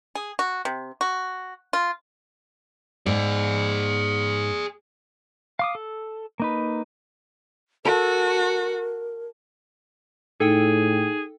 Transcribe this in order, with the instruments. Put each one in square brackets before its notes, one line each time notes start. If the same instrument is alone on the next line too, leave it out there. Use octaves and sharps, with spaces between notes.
[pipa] G#4
F#4
C3
F#4
F4
[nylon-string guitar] G#2 [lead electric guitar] G#4 D5
[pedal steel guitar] F5 D6 D#6
A4
A#3 D#4 B4
[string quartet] F#4 [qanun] A4 [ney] A#4
[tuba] A2 [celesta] D#4 [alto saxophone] G#4 [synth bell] A4 G5